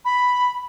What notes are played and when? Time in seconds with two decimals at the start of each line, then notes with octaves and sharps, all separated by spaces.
0.05 B5